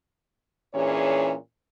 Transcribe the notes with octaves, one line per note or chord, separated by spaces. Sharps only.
A#2 E3 C#4 D4 G#4 C#5